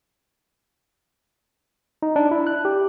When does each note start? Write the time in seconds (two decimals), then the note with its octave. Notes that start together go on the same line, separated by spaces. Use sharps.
2.02 D#4
2.16 D4
2.31 E4
2.47 F#6
2.65 G4